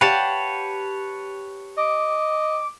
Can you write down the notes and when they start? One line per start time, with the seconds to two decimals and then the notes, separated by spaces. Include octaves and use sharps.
0.01 G4 B4 C#5 F5 F#5 A5
1.77 D#5 D6